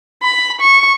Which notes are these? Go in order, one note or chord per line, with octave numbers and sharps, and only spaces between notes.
B5
C#6